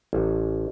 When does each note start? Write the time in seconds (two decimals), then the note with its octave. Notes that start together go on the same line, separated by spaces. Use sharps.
0.13 A1